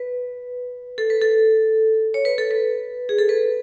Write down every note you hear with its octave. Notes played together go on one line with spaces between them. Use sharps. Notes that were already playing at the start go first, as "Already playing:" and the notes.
Already playing: B4
A4
B4
A4
C#5
B4
A4
B4
G#4
A4
B4